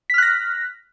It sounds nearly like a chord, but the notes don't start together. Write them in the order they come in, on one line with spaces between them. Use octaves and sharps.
B6 F6 F#6 A#6